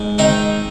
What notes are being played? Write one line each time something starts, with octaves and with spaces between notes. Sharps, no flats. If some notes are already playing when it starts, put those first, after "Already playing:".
Already playing: G#2
D#3 C4 D#4